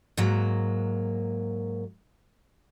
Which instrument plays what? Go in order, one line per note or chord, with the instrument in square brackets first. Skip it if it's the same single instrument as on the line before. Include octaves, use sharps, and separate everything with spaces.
[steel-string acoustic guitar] G#2 F#3 A#3